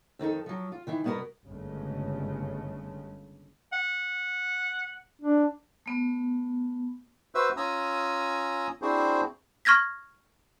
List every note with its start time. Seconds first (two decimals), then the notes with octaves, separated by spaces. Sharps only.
0.19 F2 D#3 D#4 A4
0.46 F3 F#3
0.72 F4
0.87 D#3 E3 E4
1.04 G2 B2 B3 D4 F#4 A#4
1.47 G1 C#3 G#3 A3
3.73 F#5
5.22 D4
5.86 A3 B3
7.35 F#4 B4 C5 E5 E6
7.57 C#4 F4 G#5 A#5 D#6 E6
8.82 C4 D4 E4 F#4 G#4 C5
9.65 C#6 F6 G#6 A#6 B6